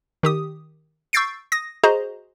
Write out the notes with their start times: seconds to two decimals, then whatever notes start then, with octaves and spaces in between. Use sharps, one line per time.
0.23 D#3 G4 D#6
1.13 C#6 E6 G6 A6 C7 D7
1.52 D#6 A#6
1.83 F#4 G#4 C5 D#5 A#5